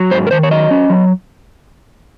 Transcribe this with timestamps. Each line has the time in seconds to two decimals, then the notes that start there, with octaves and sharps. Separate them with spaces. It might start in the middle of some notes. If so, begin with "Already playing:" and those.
Already playing: F#3
0.11 G#2 C5
0.27 A#4
0.31 D#3 C5
0.43 C#5
0.51 F#3 D#5
0.71 C#4
0.90 F#3